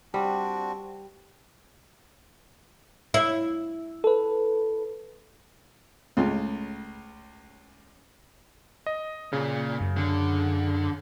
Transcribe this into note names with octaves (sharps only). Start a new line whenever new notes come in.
G3 C4 D4 F#4
E4
A4 B4
C#2 A2 C#3 F4 C6
D#5
A#2 C#3
F#2
D3